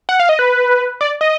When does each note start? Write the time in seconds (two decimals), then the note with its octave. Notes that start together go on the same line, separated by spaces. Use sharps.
0.09 F#5
0.20 F5
0.29 D#5
0.39 B4
1.01 D5
1.21 D#5